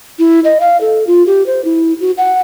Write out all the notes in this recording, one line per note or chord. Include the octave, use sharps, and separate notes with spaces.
E4
D#5
F5
A4
F4
G4
C5
E4
F#4
F#5